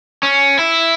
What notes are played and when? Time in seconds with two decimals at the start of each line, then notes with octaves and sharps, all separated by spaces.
0.23 C#4
0.59 E4